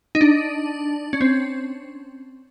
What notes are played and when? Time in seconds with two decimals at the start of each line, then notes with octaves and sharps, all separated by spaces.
0.15 D#4
0.21 D4
1.13 C#4
1.21 C4